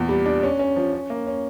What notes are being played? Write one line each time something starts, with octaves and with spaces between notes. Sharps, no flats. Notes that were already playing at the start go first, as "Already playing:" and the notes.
Already playing: E2 A#2
G3
D4
C#4
C#4
F3
C#4
A#3
C#4